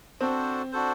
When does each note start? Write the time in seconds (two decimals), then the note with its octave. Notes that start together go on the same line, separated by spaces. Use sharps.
0.20 C4 D4 F#4 A4 C5
0.72 D4 F#4 A4 C5